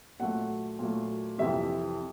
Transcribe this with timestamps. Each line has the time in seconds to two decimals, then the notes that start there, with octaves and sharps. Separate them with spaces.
0.20 A#2 F#3 A3 F#5
0.79 A#2 F#3 A3
1.38 F2 C3 E3 G3 E5